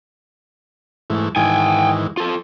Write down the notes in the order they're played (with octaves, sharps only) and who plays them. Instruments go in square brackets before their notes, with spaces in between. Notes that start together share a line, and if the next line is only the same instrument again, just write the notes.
[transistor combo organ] G#2 E3 A3
[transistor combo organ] G#2 D#3 E3 [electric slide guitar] G5 G#5
[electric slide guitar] F4 A4